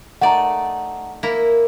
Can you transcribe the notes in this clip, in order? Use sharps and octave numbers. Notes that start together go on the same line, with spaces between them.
A3 D#4 D5 F#5 A#5
A#3 E4 A#5